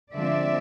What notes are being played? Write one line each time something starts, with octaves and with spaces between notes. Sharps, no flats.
D3 F3 G#3 C4 F4 D5 E5